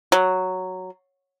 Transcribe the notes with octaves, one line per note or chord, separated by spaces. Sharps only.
F#3